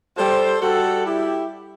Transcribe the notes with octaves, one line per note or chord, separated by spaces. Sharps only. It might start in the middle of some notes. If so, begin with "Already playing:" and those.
G3 A4 C5
G3 F#4 A4
E4 G4